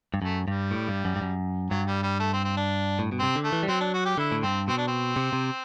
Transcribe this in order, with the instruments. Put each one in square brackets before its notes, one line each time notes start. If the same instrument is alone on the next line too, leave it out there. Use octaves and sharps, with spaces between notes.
[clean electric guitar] G2
[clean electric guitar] F#2 [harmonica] A3
[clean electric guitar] G2 [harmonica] G3
[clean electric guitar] A2
G2
F#2
G2
F#2
[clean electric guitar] G2 [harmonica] F#3
[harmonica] G3
G3
A3
C4
C4
D4
[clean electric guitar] A2
B2
[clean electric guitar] C3 [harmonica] C4
[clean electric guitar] D3
[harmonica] A3
[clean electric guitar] E3
G3
[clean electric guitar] F#3 [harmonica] C4
[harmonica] D4
F#4
G4
[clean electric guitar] D3 [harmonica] E4
[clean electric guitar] A2
[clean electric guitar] G2 [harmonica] C4
[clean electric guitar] B2 [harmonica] C4
[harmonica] D4
C4
[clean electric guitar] C3
C3